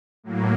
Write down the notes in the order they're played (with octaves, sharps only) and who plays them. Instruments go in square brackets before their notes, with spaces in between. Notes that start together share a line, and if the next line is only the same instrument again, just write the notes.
[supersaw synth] A2 F#3 A#3